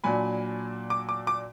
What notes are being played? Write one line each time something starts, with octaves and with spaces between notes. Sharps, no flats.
A#2 F#3 D4 G#5 B5
D6
D6
D6